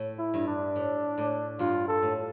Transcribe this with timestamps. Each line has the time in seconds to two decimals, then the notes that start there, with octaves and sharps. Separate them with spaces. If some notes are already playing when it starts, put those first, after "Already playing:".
Already playing: A2
0.19 E4
0.34 G2
0.48 D4
0.76 A2
1.18 A2
1.59 G2 F4
1.88 A4
2.02 A2